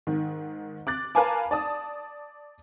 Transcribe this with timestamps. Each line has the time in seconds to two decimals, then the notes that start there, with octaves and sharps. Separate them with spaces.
0.07 G#2 D#3
0.87 D6 F#6 A6
1.15 A#4 B4 F5 G#5 A5 D6
1.51 D5 A5 D#6